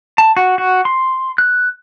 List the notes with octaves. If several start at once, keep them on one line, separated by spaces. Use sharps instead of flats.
A5
F#4
F#4
C6
F#6